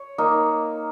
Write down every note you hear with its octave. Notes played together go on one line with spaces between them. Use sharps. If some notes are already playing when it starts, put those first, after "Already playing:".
Already playing: C#5
A#3 D#4